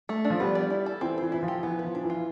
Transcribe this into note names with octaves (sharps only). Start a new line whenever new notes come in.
A3
D4
F3
G3 B3
D5
E4
A4
E3 C4
E3 C5
E3 E4
F3
G4
E3 B3
B4
F3
D4
E3
F4